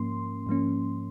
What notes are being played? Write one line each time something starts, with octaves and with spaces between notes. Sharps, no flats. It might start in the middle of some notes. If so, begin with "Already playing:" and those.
Already playing: G#2 F3 A#3 C#4 C6
G#2 F3 A#3 C#4